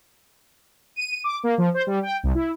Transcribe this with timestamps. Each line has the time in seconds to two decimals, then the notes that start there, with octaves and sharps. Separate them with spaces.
0.96 D#7
1.24 D6
1.44 A#3
1.58 F3
1.74 C5
1.87 G3
2.03 G5
2.23 C2
2.35 E4